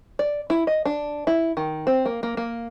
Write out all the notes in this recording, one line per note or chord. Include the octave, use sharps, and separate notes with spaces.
D5
E4
D#5
D4
E4
D#3
C4
A#3
A#3
A#3